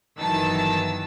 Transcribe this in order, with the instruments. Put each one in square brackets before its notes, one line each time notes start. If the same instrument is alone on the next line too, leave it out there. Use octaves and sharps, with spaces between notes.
[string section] G1 D#3 E3 F#3 A5 E6